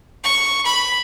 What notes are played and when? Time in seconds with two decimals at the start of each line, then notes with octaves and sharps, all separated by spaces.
0.24 C#6
0.66 B5